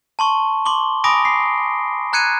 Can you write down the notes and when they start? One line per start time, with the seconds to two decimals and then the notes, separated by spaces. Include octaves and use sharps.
0.19 A5 C6 C#6
0.66 C6 D6 G7
1.04 G#5 B5 D6 D#6 A#6 D7
1.25 C7
2.13 A#5 F#6 G#6 C#7 D#7